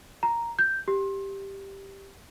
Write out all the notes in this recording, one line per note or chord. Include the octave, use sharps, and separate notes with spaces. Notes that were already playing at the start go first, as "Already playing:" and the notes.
A#5
G6
G4